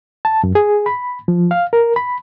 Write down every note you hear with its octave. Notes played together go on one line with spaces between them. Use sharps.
A5
F#2
G#4
B5
F3
F5
A#4
B5